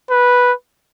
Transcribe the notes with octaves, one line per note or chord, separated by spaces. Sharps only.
B4